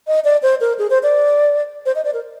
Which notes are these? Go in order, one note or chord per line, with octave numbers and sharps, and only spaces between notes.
D#5
D5
C5
A#4
G#4
C5
D5
C5
D#5
D5
A#4